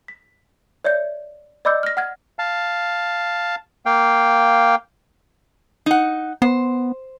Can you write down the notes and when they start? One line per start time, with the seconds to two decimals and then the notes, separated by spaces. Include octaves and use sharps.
0.08 B6
0.84 C#5 D5 E5 G6
1.65 D5 D#5 B5 D6 E6 G6
1.83 F6 A#6
1.97 F#5 F6 G#6
2.39 F5 A5
3.86 A#3 F5 G5
5.86 D#4 F#5
6.42 B3 C5